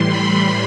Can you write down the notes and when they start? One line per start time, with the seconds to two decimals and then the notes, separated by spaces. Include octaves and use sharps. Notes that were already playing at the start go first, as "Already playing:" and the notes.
Already playing: A2 E3 G3 C6
0.09 B5